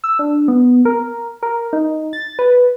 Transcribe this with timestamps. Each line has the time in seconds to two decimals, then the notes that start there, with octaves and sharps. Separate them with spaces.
0.04 E6
0.19 D4
0.48 B3
0.85 A#4
1.43 A#4
1.73 D#4
2.13 A6
2.39 B4